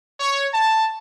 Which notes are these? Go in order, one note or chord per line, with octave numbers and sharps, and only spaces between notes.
C#5
A5